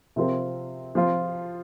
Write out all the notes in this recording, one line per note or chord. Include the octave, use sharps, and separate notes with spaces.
C3 F3 C4 F4 A#4
F3 C4 F4